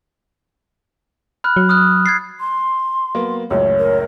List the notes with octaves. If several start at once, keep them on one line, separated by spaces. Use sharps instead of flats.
B5 F6 F#6
F#3
D#6 F6 F#6
G#6 A6 C7
C6
F#3 A#3 B3
C#2 F#2 A2 C#5
A#4